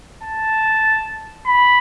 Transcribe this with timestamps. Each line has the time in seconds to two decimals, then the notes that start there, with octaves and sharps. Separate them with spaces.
0.23 A5
1.46 B5